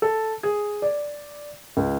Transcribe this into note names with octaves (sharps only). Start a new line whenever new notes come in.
A4
G#4
D5
C#2